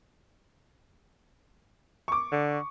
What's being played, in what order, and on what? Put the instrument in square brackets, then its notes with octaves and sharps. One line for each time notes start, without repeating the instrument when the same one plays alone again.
[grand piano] C#6 D6
[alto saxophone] D3